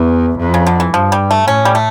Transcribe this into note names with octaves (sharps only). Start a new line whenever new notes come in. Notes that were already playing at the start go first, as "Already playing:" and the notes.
Already playing: E2 E3
F2
C#3
D3
E3
G2 F3
G3
A3
A2 C#4
G3
A3